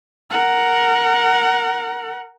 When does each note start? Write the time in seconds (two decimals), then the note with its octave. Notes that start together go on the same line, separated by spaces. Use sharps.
0.31 A#4 F#5